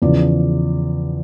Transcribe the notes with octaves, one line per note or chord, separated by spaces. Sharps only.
E2 C#3 F3 D5